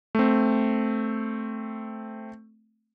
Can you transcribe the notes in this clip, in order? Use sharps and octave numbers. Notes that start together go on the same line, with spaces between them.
A3 C4